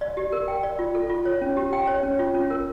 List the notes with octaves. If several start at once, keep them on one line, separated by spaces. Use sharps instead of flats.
D5
G4
A#4
G5
D5
F4
A4
F4
C#5
C#4
G4
G5
C#5
C#4
F4
C#4
A#4